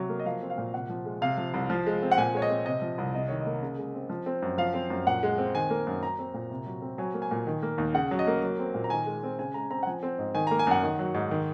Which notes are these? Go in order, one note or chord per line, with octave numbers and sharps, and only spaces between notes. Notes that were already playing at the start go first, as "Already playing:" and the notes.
Already playing: C3 F#3
A#3
D#5
F3 F5
C4
F5
A#2
C3 F#5
F3
G#3
C3 F5
F3
C2
F3
G#3
C4
F#5
A#2 G#5
G#3 C#5
D#5
C4
C3 D#5
F3
C2
C3 D#5
D#3 C#5
D#5
A#3
C#3
G#3
C4
F3
C4
F#2
F3 F5
C4
F#2
A#2 F#5
G#3
C4
D#3 G#5
A#3
F#2
F#3 A#5
C4
A#2
C3
F#3
C4
F#3 G#5
A#3
G#5
A#2
D#3
A#3
D#2
C#3 F#5
F#3
D#5
A#3
F#3
C4
A#2
A#5
D#3 G#5
G#3
C4
C#3 G#5
G#3 A#5
C4 A#5
F#5
F3 G#5
C4
G#2
D#3 G#5
A#3 A#5
G#5
F#2 F#5
D#3
F#3
G#2
D#3